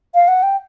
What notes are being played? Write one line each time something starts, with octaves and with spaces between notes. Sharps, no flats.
F5
F#5
G5